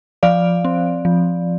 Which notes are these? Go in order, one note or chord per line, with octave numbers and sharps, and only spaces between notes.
F3 D5 F5
C4
F3